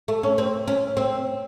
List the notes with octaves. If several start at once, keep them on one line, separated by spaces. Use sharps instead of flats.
A3
C#4
C4
C#4
C4